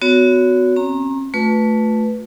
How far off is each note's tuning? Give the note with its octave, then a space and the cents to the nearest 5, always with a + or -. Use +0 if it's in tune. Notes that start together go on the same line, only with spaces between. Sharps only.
B3 +30 F#4 -5 C#5 +25
C#4 -45 A#5 +0
A3 +0 F4 +40 B4 +0